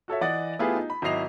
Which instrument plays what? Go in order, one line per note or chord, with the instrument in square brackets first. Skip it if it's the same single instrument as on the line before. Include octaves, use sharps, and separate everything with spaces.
[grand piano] F#4 A4 C#5 E5
E3 D5 D#5 F#5
A3 B3 E4 F4 G4 G#4
D#4
B5
G#1 F#3 E4 D#5 C7 F7